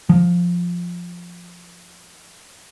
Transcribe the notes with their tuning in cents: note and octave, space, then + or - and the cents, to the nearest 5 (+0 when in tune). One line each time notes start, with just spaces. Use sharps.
F3 +5